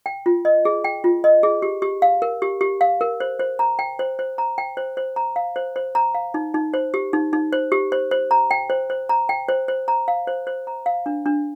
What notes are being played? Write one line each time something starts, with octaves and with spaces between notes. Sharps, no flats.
G5
F4
D#5
G#4
G5
F4
D#5
G#4
G4
G4
F5
A#4
G4
G4
F5
A#4
C5
C5
A#5
G5
C5
C5
A#5
G5
C5
C5
A#5
F5
C5
C5
A#5
F5
D#4
D#4
C5
G4
D#4
D#4
C5
G4
C5
C5
A#5
G5
C5
C5
A#5
G5
C5
C5
A#5
F5
C5
C5
A#5
F5
D4
D4